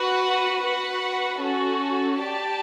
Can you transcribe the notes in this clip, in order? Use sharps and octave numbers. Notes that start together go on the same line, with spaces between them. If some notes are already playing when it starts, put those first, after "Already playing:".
Already playing: F#4 B4 F#5
F#4 B4 F#5
C#4 F#4 A4
G4 D5 A5